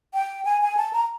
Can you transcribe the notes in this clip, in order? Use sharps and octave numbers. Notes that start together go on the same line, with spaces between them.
G5
G#5
G#5
A5
A#5